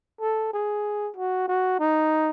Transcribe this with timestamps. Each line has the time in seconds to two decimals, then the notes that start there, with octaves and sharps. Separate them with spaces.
0.21 A4
0.54 G#4
1.16 F#4
1.48 F#4
1.80 D#4